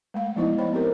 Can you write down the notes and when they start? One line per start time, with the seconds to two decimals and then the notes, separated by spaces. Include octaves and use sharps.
0.14 G#3 A3 F5
0.36 F3 B3 D#4 E4 C5 D#5
0.58 F3 C5 C#5 G5 B5
0.73 C4 G4 A4 A#4